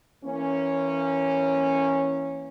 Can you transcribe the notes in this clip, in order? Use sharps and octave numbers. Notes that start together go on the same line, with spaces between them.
E3 A#3 C#4